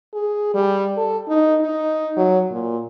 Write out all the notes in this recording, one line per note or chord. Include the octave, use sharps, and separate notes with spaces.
G#4
G3
A4
D#4
D#4
F#3
A#2